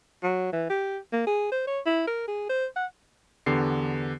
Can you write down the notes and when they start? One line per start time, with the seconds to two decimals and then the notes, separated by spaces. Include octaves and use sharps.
0.23 F#3
0.53 E3
0.70 G4
1.13 A#3
1.27 G#4
1.52 C5
1.67 C#5
1.86 E4
2.07 A#4
2.28 G#4
2.49 C5
2.76 F#5
3.46 E2 D3 B3 G4 C7